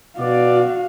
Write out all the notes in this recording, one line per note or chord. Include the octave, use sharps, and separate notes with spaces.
B2 F#4 D5 F5